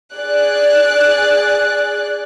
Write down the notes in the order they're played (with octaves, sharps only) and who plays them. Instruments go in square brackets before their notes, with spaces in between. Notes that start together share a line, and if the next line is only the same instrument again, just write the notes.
[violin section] G#4 D5 F#6